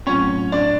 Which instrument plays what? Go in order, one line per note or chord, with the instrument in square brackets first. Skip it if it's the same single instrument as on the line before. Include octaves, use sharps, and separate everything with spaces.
[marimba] A2 F#3 A3 C4 F4 [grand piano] C#4 C#5
[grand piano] D4 D5